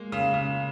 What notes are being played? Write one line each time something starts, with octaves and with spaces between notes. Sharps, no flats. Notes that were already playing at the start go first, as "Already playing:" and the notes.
Already playing: G#3 A#3
C#3
C#3